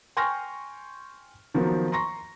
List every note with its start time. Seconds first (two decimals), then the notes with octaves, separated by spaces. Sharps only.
0.17 G5 G#5 C6 C#6 F6 A#6
1.54 D#3 F3 F#3 A#3 B3
1.92 A#5 C6 C#6 A#6